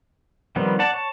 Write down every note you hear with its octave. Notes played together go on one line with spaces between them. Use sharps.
D#3 F3 G3 B3 C4
D5 F#5 A5
C#5 A5